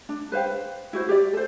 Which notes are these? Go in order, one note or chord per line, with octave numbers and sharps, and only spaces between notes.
D4
B4 C5 F5 G5
E4 F#4 C5
G4 D5
A4 C5